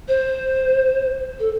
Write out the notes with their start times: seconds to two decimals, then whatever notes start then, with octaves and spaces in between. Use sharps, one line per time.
0.08 C5
1.39 A4